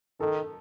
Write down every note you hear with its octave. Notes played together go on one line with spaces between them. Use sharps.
D#3 A4